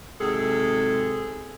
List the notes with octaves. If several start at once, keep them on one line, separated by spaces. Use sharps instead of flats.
G#2 C3 F#3 G#4 A4